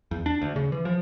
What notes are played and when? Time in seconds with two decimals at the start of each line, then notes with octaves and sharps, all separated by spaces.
0.11 E2
0.26 D4
0.42 D2
0.56 C#3
0.72 E3
0.85 F3